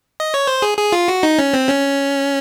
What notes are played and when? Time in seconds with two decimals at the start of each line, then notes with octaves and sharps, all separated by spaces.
0.20 D#5
0.34 C#5
0.47 C5
0.62 G#4
0.78 G#4
0.93 F4
1.08 F#4
1.23 D#4
1.39 C#4
1.54 C4
1.69 C#4